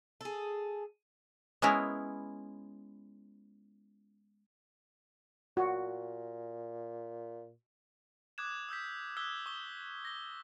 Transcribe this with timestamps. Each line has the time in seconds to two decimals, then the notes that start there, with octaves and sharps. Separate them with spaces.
0.21 G#4 A4
1.62 G#3 B3 C#4 E4 A#4
5.57 A#2 F#4
8.38 D6 D#6 F#6 G#6 E7
8.69 D#6 E6 G6 B6
9.17 D#6 E6 F#6 G#6 B6 G7
9.46 C#6 D#6 G7
10.05 A#6 G7